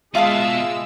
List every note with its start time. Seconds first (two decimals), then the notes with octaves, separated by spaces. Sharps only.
0.15 B2 G#3 F4 E5 F5 A5 D#6 E6